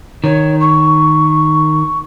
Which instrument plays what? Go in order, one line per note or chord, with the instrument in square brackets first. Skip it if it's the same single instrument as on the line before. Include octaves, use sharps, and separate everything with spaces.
[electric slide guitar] D#3 [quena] C#5
[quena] C#6